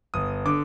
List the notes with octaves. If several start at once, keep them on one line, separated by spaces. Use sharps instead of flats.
G1 D#6
D3 D6